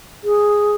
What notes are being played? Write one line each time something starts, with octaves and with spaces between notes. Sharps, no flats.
G#4